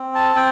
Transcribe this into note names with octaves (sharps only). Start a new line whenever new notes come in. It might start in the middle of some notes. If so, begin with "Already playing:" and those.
Already playing: C4
A5
C4 G5